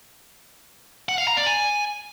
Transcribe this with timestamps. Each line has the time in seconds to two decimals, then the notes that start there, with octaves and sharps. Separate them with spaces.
1.09 F#5
1.18 F5
1.28 A#5
1.37 D5
1.46 G#5